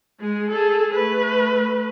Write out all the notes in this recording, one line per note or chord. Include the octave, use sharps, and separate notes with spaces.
G#3 G#4
G#4 A4
A3 B4